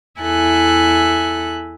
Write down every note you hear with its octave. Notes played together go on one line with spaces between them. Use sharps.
E2 E4 A4 E5 G#5 F#6